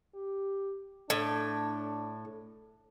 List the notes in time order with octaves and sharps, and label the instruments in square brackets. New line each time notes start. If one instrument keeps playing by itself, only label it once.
[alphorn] G4
[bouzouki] A2 [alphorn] D4